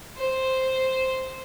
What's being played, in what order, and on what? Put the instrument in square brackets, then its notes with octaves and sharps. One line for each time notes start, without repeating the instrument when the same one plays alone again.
[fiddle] C5